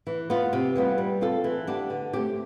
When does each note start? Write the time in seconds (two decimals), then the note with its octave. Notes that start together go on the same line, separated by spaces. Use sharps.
0.07 E3
0.30 B3 F4
0.53 C3
0.76 E3 G3 B3 F4
0.98 G3
1.21 C4 F4 A4
1.44 E3
1.67 B3 D4 G4
1.90 D3
2.13 A3 C4 G4